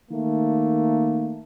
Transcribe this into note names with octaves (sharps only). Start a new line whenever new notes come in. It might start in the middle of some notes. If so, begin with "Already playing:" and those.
D#3 A3 A#3